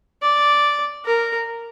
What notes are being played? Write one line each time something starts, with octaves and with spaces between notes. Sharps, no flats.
D5
A#4